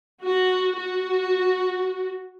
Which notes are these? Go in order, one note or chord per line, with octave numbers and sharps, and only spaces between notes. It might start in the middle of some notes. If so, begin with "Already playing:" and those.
F#4
F#4